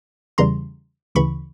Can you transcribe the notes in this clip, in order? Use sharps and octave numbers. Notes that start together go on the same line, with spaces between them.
E2 C#3 E3 G3 A#5 C6
D2 C#3 E3 B5 C#6